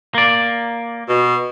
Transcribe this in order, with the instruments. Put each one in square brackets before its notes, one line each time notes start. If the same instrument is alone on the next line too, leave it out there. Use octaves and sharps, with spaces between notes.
[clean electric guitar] A#3 D5
[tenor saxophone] B2